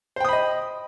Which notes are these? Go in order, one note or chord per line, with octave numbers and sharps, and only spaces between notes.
C5 D#5 G5 B5 D#6